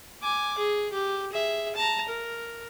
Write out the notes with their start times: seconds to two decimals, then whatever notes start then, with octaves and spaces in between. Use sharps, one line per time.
0.22 G#5 D6
0.58 G#4
0.93 G4
1.32 G#4 E5
1.75 A5 A#5
2.08 A#4